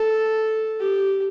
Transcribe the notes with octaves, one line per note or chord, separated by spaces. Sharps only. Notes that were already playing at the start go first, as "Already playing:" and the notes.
Already playing: A4
G4